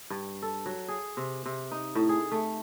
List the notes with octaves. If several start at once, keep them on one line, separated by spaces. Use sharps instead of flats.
G2
A4
F#3
G#4
C3
C3
D#4
A2
G#4
A3